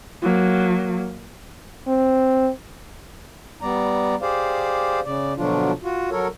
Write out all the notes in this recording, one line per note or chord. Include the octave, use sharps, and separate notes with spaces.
F#3 A#3
C4
G3 B3 D5 A#5
G4 G#4 C5 D5 F5
C#3 D5
B2 D3 F3 F#3 D4 F4
F4 F#4
F#3 A4 A#4 C#5